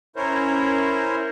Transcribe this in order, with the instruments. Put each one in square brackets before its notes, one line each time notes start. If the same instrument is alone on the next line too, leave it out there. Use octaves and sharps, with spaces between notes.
[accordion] C#4 E4 A#4 C5 C#5